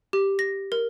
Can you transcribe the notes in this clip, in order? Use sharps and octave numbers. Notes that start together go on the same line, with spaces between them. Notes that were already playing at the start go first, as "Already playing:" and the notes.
G4
A#6
A#4